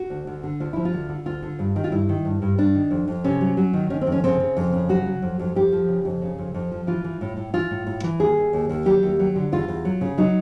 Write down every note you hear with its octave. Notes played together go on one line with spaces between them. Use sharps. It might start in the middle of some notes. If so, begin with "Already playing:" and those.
Already playing: F#4
D2
D2
D3
D2 F4
F3 E4
F4
D2
D3
D2 F4
D3
G2
D#3
F4
G2 E4
D#3
G2
G2
G2 D4
D#3
F2
F2
C3 C#4
F#3
F#3
D#3
D#3 C#4
C4
F2
C#4
C#3 C4
C#3
F2
C#3
F#3 F#4
F#3
F2
F2
F2 G4
F3
C#3
F2
C#3
F2
F2
F3
E3 F4
E3
A2
A2
E3 F4
A2
A2
E3
D#2 G#4
D#2
D#2
D#2
F#3 G4
D#2
F#3
D3
E2 F4
E2
F#3
C#3
F#3 D#4